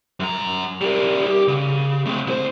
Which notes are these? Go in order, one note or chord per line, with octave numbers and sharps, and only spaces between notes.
F#2 A#5
G3 A#4
G4
C#3
A3 C4
C2 C5